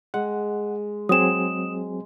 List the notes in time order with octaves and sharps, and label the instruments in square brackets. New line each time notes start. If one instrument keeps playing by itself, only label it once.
[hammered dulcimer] G#3 [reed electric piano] F#5
[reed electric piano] F#3 C4 G#4 [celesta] D#6 E7